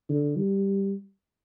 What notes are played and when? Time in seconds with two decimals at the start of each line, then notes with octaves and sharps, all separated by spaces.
0.10 D3
0.37 G3